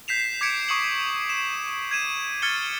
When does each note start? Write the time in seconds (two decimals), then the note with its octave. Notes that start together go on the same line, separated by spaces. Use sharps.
0.08 G6 B6 C7 E7 F7
0.41 D6 G#6 B6 C#7 D7
0.69 C#6 D#6 C#7 F#7
1.30 E7
1.91 G#6 D#7 E7
2.42 F6 G#6 A6 C#7 G7